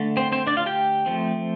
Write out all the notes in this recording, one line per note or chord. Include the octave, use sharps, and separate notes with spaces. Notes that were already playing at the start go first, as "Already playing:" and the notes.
Already playing: D3 A3
C4 C5
C4 C5
D4 D5
F4 F5
G4 G5
F3 A3 C4